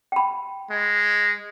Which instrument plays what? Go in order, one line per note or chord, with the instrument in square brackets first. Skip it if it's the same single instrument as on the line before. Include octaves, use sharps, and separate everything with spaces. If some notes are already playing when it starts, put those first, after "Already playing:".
[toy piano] G5 B5
[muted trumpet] G#3